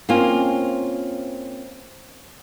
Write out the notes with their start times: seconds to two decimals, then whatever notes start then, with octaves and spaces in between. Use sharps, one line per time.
0.09 A#3 C4 C#4 F4